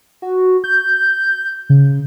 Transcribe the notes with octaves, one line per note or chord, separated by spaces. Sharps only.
F#4
G6
C#3